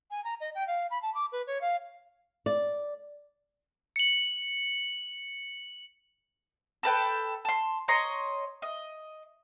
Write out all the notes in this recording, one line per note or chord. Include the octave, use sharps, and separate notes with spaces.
G#5
A#5
D#5
G5
F5
B5
A5
D6
B4
C#5
F5
D5
C#7 F#7
A4 B4 G5
A5 C6
C#5 D#5 A#5 C6
D#5